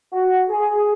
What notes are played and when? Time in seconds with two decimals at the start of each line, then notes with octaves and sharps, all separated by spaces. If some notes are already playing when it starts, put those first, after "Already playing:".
0.12 F#4
0.49 G#4